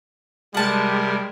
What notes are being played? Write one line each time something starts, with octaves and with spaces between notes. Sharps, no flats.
C3 G3 G#3 A#4 F#5 A5